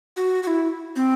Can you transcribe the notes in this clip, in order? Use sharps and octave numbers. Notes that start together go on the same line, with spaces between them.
F#4
F#4
E4
C4